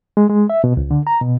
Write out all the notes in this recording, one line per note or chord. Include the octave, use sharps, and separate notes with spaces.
G#3
G#3
E5
B2
C#2
D3
A#5
B2